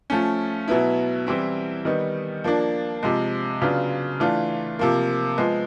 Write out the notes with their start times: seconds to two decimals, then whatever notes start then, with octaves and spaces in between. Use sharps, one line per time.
0.10 F3 A3 C#4
0.68 B2 F#3 B3 E4
1.27 E3 G3 C4 E4
1.85 D#3 G3 B3 D#4
2.44 F3 A#3 D4
3.03 C3 F3 G#3
3.62 C#3 F#3 B3 D4 F4
4.20 E3 A3 D4 F4
4.79 C3 F3 A#3
5.38 F3 G#3 B3